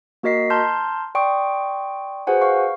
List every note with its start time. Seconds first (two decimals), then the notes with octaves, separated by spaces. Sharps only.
0.23 A#3 F#4 A#4 D#5 B6 C7
0.50 A5 A#5 C6 F6 G6
1.15 D5 G5 C6 C#6 D#6
2.27 F#4 G#4 B4 C5 F#5 G#5
2.42 F5 C#6